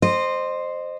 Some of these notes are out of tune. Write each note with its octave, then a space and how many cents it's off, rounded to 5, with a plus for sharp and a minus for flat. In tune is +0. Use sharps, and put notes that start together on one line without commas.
C5 +0 D#5 -25